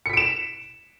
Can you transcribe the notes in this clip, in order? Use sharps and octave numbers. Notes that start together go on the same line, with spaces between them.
B6 C#7 D7 E7